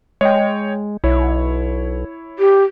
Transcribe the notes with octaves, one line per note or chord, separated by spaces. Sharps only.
G#3 C#5 D#5 G5
B1 E4 C#5
G4